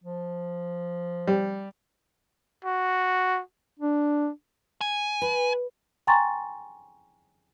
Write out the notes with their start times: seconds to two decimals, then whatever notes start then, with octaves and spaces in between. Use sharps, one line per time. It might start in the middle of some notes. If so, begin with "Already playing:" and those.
0.04 F3
1.27 G3
2.64 F#4
3.80 D4
4.81 G#5
5.22 B4
6.07 G5 G#5 A#5 C6 C#6 A6